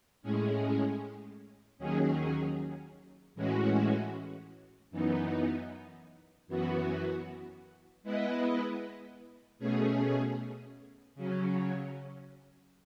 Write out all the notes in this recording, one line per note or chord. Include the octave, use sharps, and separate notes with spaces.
A2 G#3 C#4 G#4
D#2 D#3 F#3 C#4 G#4
A2 E3 G#3 C#4 F#4
F#2 E3 B3 D#4
F#2 E3 B3 F#4
G#3 B3 E4 B4 D#5
B2 A3 C#4 G#4
C#3 F#3 C#4